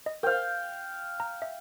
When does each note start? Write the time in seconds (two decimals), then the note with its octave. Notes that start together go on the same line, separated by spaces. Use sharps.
0.06 D#5
0.23 A#4 C5 F5 G5
1.20 A#5
1.42 E5